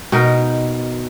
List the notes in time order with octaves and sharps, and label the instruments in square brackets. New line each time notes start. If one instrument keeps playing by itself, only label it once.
[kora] B2 D#4 A#4